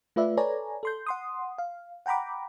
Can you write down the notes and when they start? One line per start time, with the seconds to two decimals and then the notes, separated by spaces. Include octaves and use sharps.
0.16 A3 F4 B4 D5 E5
0.37 A4 B4 C#5 D5 G#5 A#5
0.83 A4 C6 G6
1.06 F#5 C6 D#6
1.58 F5
2.06 F#5 G5 A#5 B5 D6